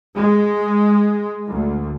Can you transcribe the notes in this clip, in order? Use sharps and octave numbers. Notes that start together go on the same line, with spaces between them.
G#3
D2